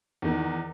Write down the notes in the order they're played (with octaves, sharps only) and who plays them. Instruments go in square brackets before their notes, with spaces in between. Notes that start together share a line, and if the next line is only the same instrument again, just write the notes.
[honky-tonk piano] E2 D#3